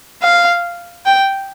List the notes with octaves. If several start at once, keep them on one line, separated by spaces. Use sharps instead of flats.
F5
G5